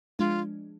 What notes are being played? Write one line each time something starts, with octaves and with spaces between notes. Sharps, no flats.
F3 G#3 D4 F4